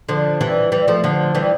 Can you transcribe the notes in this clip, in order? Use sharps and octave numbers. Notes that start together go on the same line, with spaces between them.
D3 F3
E3 G3
E3 G3
F3 A3
D3 F3
E3 G3